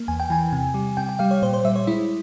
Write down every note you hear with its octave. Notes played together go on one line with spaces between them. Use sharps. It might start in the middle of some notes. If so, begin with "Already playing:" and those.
Already playing: A#3
E2 G#5
G5
E3 G#5
C3
G3
C3 G5
G5
G3 F5
C#5
A#2 C5
C5
G3 E5
C#5
G#3 E4